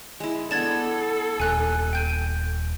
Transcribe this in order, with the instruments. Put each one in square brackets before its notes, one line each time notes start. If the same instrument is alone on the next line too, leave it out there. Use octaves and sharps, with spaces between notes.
[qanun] G#3 E4
[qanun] B3 D4 [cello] A4 [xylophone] G#6 A6 E7
[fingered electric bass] D#1 [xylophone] G#5 F#6
[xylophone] G5 G6 D#7